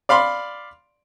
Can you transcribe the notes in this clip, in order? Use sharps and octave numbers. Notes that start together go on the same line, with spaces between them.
D5 F5 B5 C6